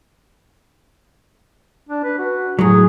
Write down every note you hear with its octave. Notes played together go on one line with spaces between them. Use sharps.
D4
B4
F#4
A2 F#3 G#4